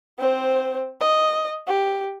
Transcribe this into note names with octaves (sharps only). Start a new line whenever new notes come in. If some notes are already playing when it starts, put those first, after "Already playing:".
C4 C5
D#5
G4